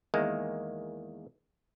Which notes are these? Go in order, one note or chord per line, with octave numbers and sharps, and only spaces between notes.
E2 D#3 G#3 A#3